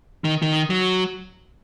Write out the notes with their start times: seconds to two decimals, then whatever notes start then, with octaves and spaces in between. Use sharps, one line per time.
0.24 D#3
0.42 D#3
0.70 F#3